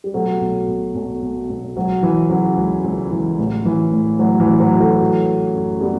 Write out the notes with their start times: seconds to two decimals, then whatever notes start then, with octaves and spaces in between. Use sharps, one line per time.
0.04 G3
0.14 B2 F#3 A3
0.41 B1
0.68 B2
0.95 B1
1.23 B2
1.50 B1
1.75 C#2 F#3
2.03 E3
2.30 C#3 F#3
2.57 C#2
2.84 C#2
3.12 E3
3.38 A1
3.65 E3
3.92 A2
4.19 A1 F#3
4.40 E3
4.46 A1
4.60 F#3
4.74 E3
4.80 F#3 A3
5.01 E3
5.28 C#3
5.55 F#2
5.81 G3 B3